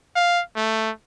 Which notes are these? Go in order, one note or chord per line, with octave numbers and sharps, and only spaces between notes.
F5
A3